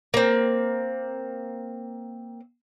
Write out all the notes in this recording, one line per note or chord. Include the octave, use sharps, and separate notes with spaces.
A#3 C4